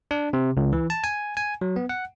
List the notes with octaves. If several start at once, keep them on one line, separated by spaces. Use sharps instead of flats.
D4
C3
C#2
E3
A5
G#5
G#5
F#3
B3
F#5